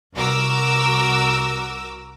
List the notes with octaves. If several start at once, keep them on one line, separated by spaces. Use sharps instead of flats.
C2 F#4 A#4 D6 E6